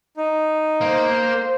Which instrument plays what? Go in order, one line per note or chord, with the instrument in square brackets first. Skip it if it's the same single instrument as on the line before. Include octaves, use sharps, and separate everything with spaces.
[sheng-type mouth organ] D#4
[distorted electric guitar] A#3 [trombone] C5